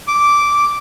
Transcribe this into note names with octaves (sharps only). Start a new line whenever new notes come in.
D6